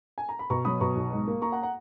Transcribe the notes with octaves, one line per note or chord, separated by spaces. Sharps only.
G#5
A#5
B5
B2 A#5 C#6
F#3 B5 D#6
B2 A#5 C#6
B1
G#2
A#3
A#3 A#5 C#6
F#5 A#5
F#5 A#5